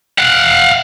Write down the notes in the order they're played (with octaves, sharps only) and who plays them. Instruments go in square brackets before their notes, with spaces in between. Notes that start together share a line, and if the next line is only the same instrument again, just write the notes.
[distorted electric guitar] F5 F#5